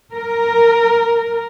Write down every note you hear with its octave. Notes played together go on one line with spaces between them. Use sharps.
A#4